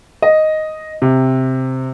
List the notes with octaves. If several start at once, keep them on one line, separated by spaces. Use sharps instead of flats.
D#5
C3